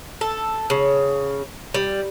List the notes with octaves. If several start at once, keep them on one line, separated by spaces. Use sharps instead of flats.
A4
C#3
G3